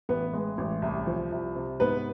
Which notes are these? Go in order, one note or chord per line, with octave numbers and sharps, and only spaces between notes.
A1 B3 B4
G#3
A1
C2
F3
C2
C3
G#2 B3 B4